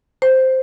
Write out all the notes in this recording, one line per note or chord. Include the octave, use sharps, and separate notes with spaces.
C5